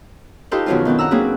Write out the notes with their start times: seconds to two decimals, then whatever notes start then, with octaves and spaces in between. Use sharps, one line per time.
0.51 D#4 F4 G4 A4 B4 C5
0.66 F#2 B2 D#3 F3 F#3 F4
0.85 D#3 B3 C4 D4
0.99 F#5 A#5 E6
1.11 F#3 A#3 C4 D4 G#4 B4